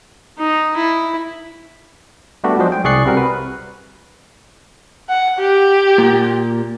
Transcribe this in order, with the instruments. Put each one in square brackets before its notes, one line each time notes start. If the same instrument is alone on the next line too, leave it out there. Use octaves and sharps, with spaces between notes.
[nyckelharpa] D#4
E4
[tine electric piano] G3 A3 B3 D4 F#4 G4
F3 F#3 G#3 D4 G#4 C5
G5
C2 G#4 D5 C#6 F#6 C7
C3 G3 C4 F#4 A#4
B4
[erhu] F#5
G4
[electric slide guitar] A#2